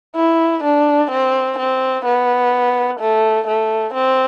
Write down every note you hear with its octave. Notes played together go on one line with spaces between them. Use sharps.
E4
D4
C4
C4
B3
A3
A3
C4